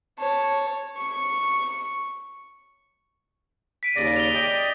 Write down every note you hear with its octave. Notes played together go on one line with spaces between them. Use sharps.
C#5 A5
C#6
B6 D7 D#7
D#2 C#3 D5 A#6
F7 G7
D5 D#5 G5 G7